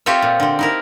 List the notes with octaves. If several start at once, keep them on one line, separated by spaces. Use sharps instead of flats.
C4 F4 G4 A4 C#5 E5
A#2
D3 C4
D#4 E4 A#4